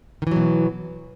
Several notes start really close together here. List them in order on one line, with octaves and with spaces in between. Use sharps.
D#3 E3 F#3 B2